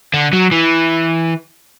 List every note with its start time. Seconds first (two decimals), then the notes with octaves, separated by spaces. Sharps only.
0.14 D3
0.33 F#3
0.52 E3